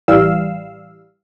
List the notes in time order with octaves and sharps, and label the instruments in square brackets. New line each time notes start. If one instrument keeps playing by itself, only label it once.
[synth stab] A1 E3 G3 F5 E6